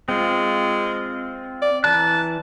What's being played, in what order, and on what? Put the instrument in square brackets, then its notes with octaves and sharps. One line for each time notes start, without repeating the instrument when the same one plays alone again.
[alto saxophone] G#3 [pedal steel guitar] C4 F4
[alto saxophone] D5
[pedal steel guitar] E3 A#5 F#6 [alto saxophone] A5